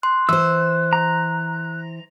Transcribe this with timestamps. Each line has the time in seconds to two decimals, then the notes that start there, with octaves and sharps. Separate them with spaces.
0.03 C6 F#6
0.29 E3 C5 E6
0.93 A#5